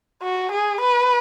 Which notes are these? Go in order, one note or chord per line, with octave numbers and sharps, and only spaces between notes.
F#4
G#4
B4